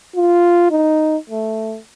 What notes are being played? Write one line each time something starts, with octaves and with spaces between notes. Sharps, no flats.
F4
D#4
A3